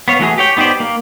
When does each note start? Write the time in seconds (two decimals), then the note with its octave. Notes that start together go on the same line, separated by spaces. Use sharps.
0.08 B3 C#5 F5
0.19 E3 A3 F#4 G#4
0.38 G4 C#5 G5
0.57 B3 D#4 G4 C5 D5
0.80 A#3